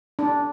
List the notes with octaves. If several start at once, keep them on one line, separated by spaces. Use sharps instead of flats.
D4